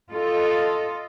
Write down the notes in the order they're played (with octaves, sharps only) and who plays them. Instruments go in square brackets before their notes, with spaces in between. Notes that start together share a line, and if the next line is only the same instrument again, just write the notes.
[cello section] F4 A4 D#5